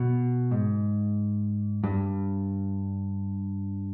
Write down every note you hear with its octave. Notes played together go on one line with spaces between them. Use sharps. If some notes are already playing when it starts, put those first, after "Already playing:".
Already playing: B2
G#2
G2